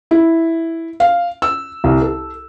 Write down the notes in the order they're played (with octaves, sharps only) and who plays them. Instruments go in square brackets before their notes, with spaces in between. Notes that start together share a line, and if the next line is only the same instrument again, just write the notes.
[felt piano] E4
F5
E6
C2
A4